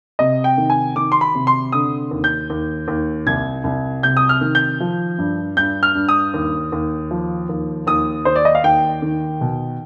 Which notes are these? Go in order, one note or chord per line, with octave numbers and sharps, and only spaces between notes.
C3 D#5
G5
D#3
G#5
D#3 D6
C6
B5
C3
C6
D3 D#6
D#2
G6
D#2
D#2
C2 G#6
C2
C3 G6
D#6
F6
D#3
G6
F3
G2
G2 G6
F6
G2
D#6
D#2
D#2
F3
D#2
D#2 D#6
D#3 C5
D5
D#5
F5
D#2 G5
D#3
B2